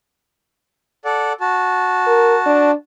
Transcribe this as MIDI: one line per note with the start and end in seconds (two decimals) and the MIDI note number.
1.05 1.33 69
1.05 1.33 74
1.05 1.33 78
1.41 2.71 66
1.41 2.71 81
2.07 2.36 70
2.46 2.73 62